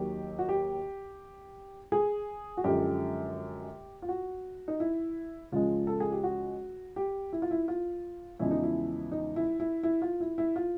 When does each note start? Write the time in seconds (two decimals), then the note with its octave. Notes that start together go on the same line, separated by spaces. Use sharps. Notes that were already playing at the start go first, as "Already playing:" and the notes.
Already playing: D#2 D#3 F#3 G4
0.39 F#4
0.49 G4
1.92 G#4
2.57 F#4
2.64 F#2 D3 F3 G#3 G4
4.02 F4
4.09 F#4
4.68 D#4
4.80 E4
5.52 C#2 C#3 F3 G#3 F4
5.87 A4
6.00 G#4
6.12 G4
6.24 F#4
6.96 G4
7.33 E4
7.42 F4
7.51 E4
7.68 F4
8.39 E2 C#3 F3 G#3 E4
8.51 D#4
8.63 E4
9.12 D#4
9.36 E4
9.60 E4
9.83 E4
10.02 F4
10.20 E4
10.38 E4
10.56 F4